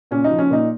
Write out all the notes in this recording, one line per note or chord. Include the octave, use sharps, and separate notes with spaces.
A#2 C#4
D#4
F3
C#4
A#2 D#4